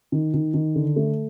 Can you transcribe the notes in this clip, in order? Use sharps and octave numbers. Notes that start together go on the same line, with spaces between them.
D#3
D#3
D#3
D3
A3